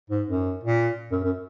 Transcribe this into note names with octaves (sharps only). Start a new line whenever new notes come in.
G#2
F#2
A#2
F#2
F#2